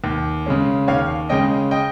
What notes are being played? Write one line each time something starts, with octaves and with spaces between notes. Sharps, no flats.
D#2
C#3 G#3 C#4
D#2 C#5 F5
C#3 G#3 C#4 D#5 G5
D#5 G5